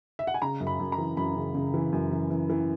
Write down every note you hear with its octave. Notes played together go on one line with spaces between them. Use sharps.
E5
F#5
G#5
C#3 A#5
F#2
B5
F#2
A#5
E3
F#2 B5
C#3
C#3
E3
F#2
E3
E3
E3